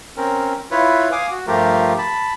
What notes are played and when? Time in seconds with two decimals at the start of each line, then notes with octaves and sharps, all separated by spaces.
0.17 C4 C#4 A#4
0.71 E4 F4 B4 C#5
1.12 F5 G#5 D6 D#6
1.31 F#4
1.47 G2 F3 A3 F4 G4 A#4
1.98 A5 B5